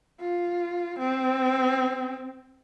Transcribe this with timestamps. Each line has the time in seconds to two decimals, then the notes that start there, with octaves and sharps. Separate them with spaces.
0.20 F4
0.99 C4